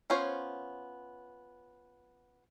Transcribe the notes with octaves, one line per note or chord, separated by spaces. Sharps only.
B3 C#4 F4 C5 C#5